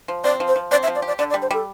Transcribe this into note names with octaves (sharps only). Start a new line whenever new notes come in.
F3
C4 D5
F3
C5
F3
C4 D5
E5
F3
D5
G4
D5
D3 D5
D5
G3
C5
G3 A4